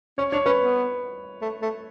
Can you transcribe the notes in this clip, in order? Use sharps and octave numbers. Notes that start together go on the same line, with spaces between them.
C#4 C#5
D4 C#5
C#4 B4
B3
A3
A3